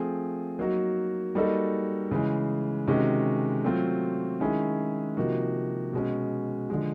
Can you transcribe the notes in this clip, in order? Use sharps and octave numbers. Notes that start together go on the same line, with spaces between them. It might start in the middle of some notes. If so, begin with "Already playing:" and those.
Already playing: F3 A3 C4 F4 G#4
F#3 A#3 D#4 F#4 A#4
G3 A#3 D#4 F#4 A4
C#3 E3 G#3
C3 D#3 G#3 C#4 F#4
F#3 A3 C4 F4
D#3 G#3 C#4 E4 G#4
C3 F3 A#3 D#4 F#4
B2 G#3 C#4
D3 F3 G#3